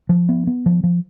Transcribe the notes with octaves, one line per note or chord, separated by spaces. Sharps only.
F3
B3
B3
F3
F3